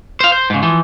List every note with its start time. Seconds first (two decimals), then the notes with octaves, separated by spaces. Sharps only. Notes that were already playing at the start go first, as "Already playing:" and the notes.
0.20 C5 F5
0.32 C5
0.50 G#2 C#3
0.63 E3 F3